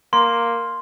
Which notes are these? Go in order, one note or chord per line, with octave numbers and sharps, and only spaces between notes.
A#3 C6